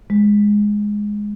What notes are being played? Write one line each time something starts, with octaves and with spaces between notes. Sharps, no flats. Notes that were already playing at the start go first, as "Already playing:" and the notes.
G#3